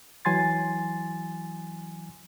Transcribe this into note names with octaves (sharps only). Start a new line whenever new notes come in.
E3 F#3 G#5 C6 A6